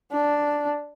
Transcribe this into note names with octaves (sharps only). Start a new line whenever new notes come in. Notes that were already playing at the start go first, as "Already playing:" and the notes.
D4